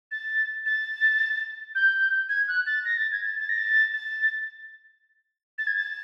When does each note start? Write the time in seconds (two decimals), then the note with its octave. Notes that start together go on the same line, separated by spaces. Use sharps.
0.11 A6
0.66 A6
1.75 G6
2.29 G#6
2.48 F#6
2.66 A6
2.85 A#6
2.97 A6
3.12 G#6
3.26 A6
3.39 A6
3.49 A#6
3.58 A6
3.94 A6
5.58 A6
5.67 G#6
5.76 A6